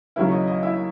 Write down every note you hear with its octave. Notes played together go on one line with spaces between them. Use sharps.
D#2 C#3 F#3 C#4 E4 E5
C#5
D#5
D#5
E4 E5